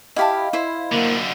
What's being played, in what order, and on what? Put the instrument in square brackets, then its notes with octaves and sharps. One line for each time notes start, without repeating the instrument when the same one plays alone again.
[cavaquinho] E4 G4 A5 [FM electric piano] D#5 F5 B5
[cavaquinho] E4 C5
[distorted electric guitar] F#2 D3 [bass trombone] A#3